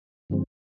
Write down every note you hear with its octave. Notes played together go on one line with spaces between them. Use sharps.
G2 D3 F3 G#3 C4